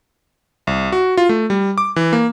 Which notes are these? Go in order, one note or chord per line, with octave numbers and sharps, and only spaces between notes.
C2
F#4
F4
A3
G3
D6
E3
A#3